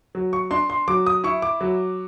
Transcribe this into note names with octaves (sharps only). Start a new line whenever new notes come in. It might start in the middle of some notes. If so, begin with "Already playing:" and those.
F#3
C#6
D4 C6
C6
F#3 D6
D#6
E4 C#6
D6
F#3